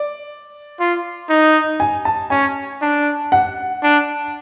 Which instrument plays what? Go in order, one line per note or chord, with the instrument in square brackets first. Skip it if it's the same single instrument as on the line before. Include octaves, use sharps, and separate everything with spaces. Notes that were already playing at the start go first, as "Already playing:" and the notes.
Already playing: [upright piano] D5
[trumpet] F4
D#4
[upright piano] G#5
A5
[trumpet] C#4 [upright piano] G#5
[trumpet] D4
[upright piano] F#5
[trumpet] D4